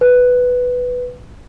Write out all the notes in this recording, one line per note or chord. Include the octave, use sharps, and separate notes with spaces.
B4